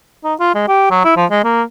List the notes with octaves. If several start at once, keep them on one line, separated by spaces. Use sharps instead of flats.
D#4
F4
G#3
G4
F#3
E4
F3
G#3
A#3